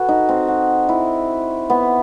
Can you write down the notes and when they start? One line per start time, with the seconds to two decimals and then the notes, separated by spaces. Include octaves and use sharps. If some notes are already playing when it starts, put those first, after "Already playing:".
Already playing: F#4 A4 B4
0.09 D#4
0.29 C4
0.48 F#4
0.89 E4
1.70 B3